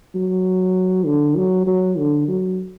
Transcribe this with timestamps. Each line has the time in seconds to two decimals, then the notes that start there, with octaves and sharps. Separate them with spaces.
0.15 F#3
1.06 D3
1.36 F#3
1.67 F#3
1.98 D3
2.28 F#3